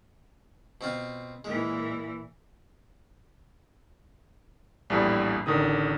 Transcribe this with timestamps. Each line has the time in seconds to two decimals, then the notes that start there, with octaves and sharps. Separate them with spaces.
0.81 B2 C4 F4
1.45 A#2 E3 G#3
4.90 A#1 E2 A2 G3 A5
5.46 A1 D3 D#3 D#6